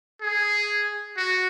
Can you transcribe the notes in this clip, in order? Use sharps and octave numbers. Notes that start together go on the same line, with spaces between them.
G#4
F#4